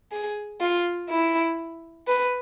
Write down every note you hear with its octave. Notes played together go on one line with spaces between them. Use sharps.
G#4
F4
E4
B4